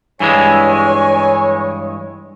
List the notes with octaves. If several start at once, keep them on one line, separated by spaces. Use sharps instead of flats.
G2 E3 G#3 C#5 G#5